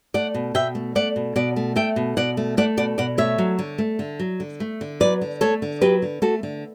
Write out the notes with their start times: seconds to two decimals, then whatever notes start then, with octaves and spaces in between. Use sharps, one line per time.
0.14 A3 D5 F#5
0.34 B2
0.54 B2 E5 G5
0.75 A3
0.95 A3 D5 F#5
1.16 B2
1.36 B2 D5 F#5
1.56 A3
1.76 A3 E5 G5
1.96 B2
2.17 B2 D5 F#5
2.37 A3
2.57 A3 D5 F#5
2.77 B2 D5 F#5
2.98 B2 D5 F#5
3.18 A3 C#5 E5
3.38 F#3
3.59 D3
3.78 A3
3.99 D3
4.20 F#3
4.40 D3
4.60 A3
4.81 D3
5.00 F#3 B4 D5
5.22 D3
5.41 A3 A4 C#5
5.62 D3
5.81 F#3 G4 B4
6.02 D3
6.22 A3 F#4 A4
6.43 D3